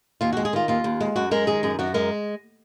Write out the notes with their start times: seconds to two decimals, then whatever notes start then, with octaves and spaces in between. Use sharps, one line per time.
0.21 D#2 F4
0.32 G#3 F#4
0.45 G#4
0.53 D#3 F4
0.68 D#2 F4
0.84 D#2
1.00 G#3
1.16 F#2 F#4
1.31 G#3 A#4
1.47 D#3 G#4
1.63 F#2 G#4
1.79 F#2 F#4
1.94 G#3 A#4